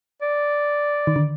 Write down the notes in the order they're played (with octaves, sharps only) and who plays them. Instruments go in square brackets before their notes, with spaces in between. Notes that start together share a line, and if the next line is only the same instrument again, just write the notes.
[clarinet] D5
[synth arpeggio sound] D#3
D3